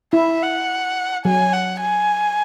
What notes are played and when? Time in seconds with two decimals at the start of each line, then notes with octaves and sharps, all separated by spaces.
0.13 E4 E5
0.41 F#5
1.25 F#3 G#5
1.53 F#5
1.82 G#5